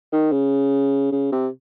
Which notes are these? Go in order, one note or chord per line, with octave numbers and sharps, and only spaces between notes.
D#3
C#3
C#3
C3